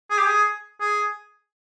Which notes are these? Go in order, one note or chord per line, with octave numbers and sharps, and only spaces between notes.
G#4
G4
G#4
G#4